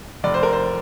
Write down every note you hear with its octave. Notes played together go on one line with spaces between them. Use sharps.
F1 D5
C5
A#4
C5